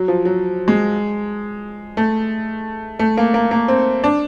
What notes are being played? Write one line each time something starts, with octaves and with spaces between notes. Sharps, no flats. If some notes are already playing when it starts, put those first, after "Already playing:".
Already playing: F#3
F3
F#3
G#3
A3
A3
A#3
A#3
A#3
C4
D4